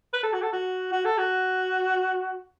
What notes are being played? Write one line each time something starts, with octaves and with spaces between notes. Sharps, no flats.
B4
A4
F#4
A4
F#4
F#4
A4
F#4